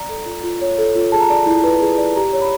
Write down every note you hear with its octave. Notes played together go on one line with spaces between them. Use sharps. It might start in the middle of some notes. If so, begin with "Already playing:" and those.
Already playing: D5 A#5
A4
F4
F4
C#5
A4
F4
G#4 A5
A#5
D5 A5
E4
B4
G#4
D5
G4 A#5
C#5
B5